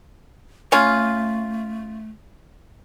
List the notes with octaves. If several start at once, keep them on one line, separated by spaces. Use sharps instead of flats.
A3 C#4 F4